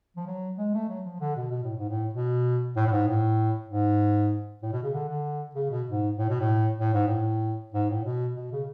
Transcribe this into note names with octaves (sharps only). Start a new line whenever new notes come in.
F3
F#3
G#3
A3
F#3
F3
D3
B2
B2
A2
G#2
A2
B2
A2
A2
G#2
A2
G#2
A2
B2
C#3
D3
D3
C#3
B2
G#2
A2
B2
A2
A2
G#2
A2
G#2
A2
B2
B2
C#3